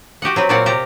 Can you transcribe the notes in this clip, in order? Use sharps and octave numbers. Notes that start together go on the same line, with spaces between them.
F#4 G4 D#5 F#5
F#3 C4 B4
A#2 F#3 C4 D5 F5 F#5
C3 G4 C5 D5 A#5